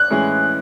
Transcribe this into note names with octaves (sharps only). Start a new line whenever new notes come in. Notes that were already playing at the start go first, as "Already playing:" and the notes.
Already playing: F#6
A2 E3 G#3 C#4 G#4